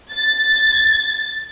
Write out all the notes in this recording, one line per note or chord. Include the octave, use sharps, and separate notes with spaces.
A6